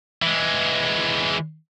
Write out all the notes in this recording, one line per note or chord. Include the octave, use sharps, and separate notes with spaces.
E3 G#3